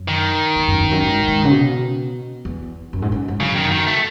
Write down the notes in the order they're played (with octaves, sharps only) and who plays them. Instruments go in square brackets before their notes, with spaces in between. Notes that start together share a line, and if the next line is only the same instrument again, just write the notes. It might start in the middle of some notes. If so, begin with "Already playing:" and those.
Already playing: [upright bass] F#2
[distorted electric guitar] D#3
[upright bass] E2
F#2
E2
F#2
G#2
G#2
C#3
B2
E2
F#2
G#2
F#2
G#2
[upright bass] F#2 [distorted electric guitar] C#3
[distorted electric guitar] D#3
D#3
A3